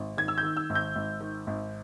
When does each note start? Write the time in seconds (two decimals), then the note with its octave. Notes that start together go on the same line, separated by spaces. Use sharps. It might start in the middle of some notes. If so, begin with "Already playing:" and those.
Already playing: G#1
0.17 D#3 G#6
0.28 E6
0.38 G6
0.43 D#3
0.57 E6
0.70 G#1
0.75 G6
0.96 G#1
1.20 D#3
1.47 G#1